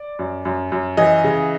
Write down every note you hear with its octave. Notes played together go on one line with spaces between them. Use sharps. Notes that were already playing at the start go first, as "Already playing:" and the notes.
Already playing: D5
F#2
F#2
F#2
E3 D#5
C#3